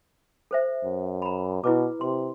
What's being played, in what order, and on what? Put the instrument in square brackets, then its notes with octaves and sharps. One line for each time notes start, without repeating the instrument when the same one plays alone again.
[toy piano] A4 C5 E5
[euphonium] F#2
[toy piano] A#5 B5
[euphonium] B2 [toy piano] E4 B4 D6
[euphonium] C3 [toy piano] C6